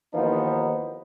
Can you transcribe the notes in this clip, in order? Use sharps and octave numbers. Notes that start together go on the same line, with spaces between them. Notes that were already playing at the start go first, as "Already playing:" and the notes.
D#2 E3 F3 B3 D#4 C5